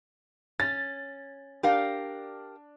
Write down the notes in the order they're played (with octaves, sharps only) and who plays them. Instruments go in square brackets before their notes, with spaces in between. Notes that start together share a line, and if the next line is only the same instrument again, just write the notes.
[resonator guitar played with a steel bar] C#4 [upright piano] A6
[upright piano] D4 [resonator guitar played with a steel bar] G4 A#4 F5